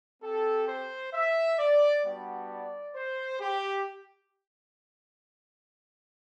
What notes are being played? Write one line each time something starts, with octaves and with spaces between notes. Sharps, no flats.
C4 G4 A4
C5
E5
D5
G3 B3 D4 F#4
D5
C5
G4